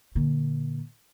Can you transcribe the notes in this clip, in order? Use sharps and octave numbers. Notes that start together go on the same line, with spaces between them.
A#2 D3